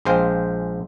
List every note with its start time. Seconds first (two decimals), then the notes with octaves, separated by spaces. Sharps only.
0.05 A#1 G#3 C5 F5 G5